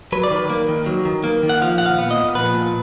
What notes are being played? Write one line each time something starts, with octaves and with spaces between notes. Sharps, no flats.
F#3 B4
D5
D#3 B4
A#3
D#3
F#3
D#3
A#3
D#3
F#5
F3 F5
A#2 F#5
F5
B3
D#5
A#2
F3 B4
A#2